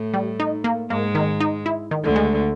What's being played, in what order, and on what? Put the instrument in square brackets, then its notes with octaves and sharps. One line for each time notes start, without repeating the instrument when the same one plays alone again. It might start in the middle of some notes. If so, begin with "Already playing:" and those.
Already playing: [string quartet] A2 A3
[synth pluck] G3
D#4
A#3
[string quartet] G#2 G#3 [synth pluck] A#3
[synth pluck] D#3
D#4
E4
D#3
[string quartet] D2 D3
[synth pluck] G#3